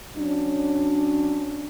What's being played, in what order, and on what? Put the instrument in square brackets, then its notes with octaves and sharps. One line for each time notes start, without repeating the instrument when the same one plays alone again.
[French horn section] F#3 C#4 D4